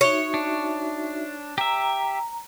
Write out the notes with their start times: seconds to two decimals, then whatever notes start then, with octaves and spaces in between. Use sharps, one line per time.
0.01 D#4 F#4 C#5 E5
0.34 D4
1.58 G4 E5 A#5